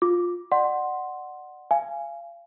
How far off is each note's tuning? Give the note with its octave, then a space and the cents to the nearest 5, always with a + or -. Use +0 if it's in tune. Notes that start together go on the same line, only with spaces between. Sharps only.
F4 +10 D6 +0
D5 +30 F#5 +0 C6 +5
F5 -30 G#5 +0